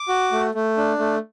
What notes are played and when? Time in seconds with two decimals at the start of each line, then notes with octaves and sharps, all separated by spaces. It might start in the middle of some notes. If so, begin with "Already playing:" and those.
Already playing: D6
0.08 F#4
0.32 A3
0.54 A3
0.77 D4
0.99 A3